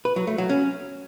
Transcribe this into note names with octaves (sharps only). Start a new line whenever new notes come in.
B4
F#3
A3
F#3
C#4